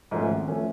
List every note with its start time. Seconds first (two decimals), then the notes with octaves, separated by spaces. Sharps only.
0.11 G#2 F3 A3 C#4
0.30 G#1
0.48 F3 A3 C#4